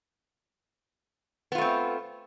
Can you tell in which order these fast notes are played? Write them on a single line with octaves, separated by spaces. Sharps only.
B3 F4 A3 C4